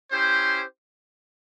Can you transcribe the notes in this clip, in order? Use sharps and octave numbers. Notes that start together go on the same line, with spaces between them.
C#4 E4 G4 C5